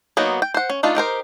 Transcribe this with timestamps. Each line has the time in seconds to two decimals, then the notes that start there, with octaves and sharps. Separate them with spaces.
0.17 F#3 A#3 B3 D#4 F#4
0.42 G5
0.54 C5 F#5
0.70 C#4
0.83 A3 D4 D#4 F4
0.95 D#4 G4 A#4 C5